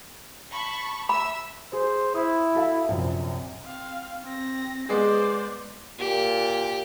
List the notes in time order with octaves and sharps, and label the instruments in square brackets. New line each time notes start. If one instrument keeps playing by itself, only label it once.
[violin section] A5 B5 C#6
[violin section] E5 E6 [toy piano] B5
[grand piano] G#4 [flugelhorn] C5
[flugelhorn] E4 [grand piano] D#6
[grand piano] F#4 A4 F5
A#1 F#2 C3
[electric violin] C4 F5
C4 A#6
[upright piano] G#3 B3 G#4 [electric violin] C5 D5
[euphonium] A#2 [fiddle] G4